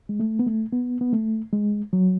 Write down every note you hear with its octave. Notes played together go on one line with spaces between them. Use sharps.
G#3
A3
B3
A3
B3
B3
A3
G#3
F#3